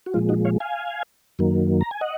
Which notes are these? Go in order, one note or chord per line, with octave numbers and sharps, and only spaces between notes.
F#4
A#2 F3 G#3 F4
D#4 F#4
C#5 F5
F5 G#5
F#2 D#3 F#3 A#3
A#5
G#5
D#5 F#5